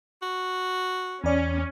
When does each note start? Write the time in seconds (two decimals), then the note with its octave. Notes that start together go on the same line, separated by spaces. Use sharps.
0.22 F#4
1.24 E2 C#4 D5